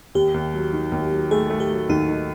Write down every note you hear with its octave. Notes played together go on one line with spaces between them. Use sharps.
D#2 G4
D#2
F#3
D#3
D#2
F#3
A3 G#4
A3
G4
F#3
D#2 D#4
D#3